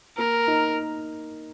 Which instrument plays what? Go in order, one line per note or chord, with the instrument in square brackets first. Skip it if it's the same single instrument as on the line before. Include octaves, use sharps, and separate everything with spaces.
[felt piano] A#3 [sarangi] A#4
[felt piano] D#4